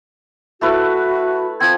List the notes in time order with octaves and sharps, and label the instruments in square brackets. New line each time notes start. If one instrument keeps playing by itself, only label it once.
[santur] A3 E4 B4 [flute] F#4
[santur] F3 C4 [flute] G#6